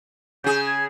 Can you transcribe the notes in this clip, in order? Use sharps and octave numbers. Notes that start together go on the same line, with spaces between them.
C#3 G#4 G6
G#6